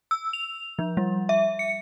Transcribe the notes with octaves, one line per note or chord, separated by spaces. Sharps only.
E6
F7
F3
G3
E5
C#7